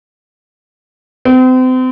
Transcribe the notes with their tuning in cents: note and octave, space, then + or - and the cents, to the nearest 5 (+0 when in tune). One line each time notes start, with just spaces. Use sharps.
C4 -35